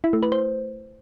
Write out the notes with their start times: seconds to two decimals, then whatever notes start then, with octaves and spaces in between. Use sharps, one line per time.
0.04 E4
0.13 A3
0.23 B4
0.32 C5